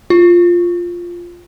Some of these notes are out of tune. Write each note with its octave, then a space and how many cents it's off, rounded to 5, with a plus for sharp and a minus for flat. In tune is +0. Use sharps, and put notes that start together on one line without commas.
F4 +0